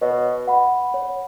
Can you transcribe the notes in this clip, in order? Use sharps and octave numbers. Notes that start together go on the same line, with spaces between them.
B2 C#5
F#5 B5
C#5